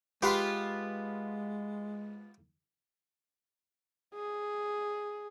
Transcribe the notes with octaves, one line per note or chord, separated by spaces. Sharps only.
G#3 B3 F4 G4 B4 C6
G#4